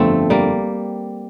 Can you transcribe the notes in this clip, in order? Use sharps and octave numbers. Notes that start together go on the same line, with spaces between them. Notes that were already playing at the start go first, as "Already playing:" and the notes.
Already playing: G1 F2 D3 F3 A3 C4
G3 A#3